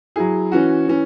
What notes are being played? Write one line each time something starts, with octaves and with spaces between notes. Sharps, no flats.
F#3 E4 G#4
E3 C#4 F#4
E3 C#4